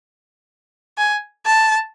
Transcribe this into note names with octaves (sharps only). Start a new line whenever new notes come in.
G#5
A5